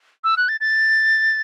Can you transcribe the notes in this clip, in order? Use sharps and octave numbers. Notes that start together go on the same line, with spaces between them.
E6
F#6
A6
A6